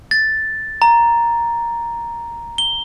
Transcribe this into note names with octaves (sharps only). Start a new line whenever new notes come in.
A6
A#5
G7